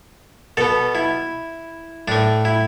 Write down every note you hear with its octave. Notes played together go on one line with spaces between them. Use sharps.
B2 B3 A4
E4
A2 A3 D4
E4